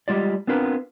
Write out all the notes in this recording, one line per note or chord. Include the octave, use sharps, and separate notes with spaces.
G3 G#3 F4 D5
B3 C4 D4 F4 A#4 B4